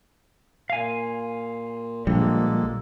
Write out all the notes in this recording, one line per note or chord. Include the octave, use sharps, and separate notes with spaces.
A#2 F5 G#5
A#1 D3 G3 G#3 A#3 A4